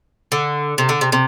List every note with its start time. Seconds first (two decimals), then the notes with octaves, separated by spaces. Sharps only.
0.32 D3
0.78 C3
0.89 D3
1.01 C3
1.12 C3